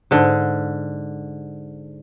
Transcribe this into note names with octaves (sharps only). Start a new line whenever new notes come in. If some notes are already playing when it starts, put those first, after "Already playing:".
G#2 D3